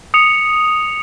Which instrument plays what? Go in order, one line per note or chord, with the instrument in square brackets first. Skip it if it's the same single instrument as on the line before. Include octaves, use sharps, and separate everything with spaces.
[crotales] D#6 C#7 F7